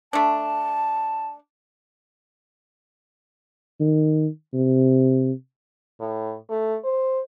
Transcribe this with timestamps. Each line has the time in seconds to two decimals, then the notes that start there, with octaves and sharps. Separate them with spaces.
0.13 A3 D4 A5
3.80 D#3
4.54 C3
6.00 A2
6.50 A3
6.84 C5